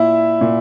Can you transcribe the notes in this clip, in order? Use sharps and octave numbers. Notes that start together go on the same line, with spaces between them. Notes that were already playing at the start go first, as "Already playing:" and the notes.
Already playing: A#2 E4 E5
A#2